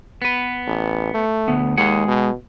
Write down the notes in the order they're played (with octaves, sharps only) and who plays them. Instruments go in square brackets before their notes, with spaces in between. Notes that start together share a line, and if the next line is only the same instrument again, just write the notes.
[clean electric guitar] B3 B4
[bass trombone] A1
A3
[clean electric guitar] D2 B3
[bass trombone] D#2 [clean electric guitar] G#3 G#4 F#5
[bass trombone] B2